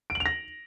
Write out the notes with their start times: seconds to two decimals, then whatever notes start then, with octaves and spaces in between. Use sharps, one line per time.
0.10 D7
0.15 F#7
0.20 F7
0.26 A#6